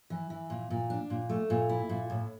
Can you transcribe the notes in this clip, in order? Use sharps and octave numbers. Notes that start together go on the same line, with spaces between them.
E3
E3
A#2
A#2
D4
A#2
A3
A#2
E4
A#2
A2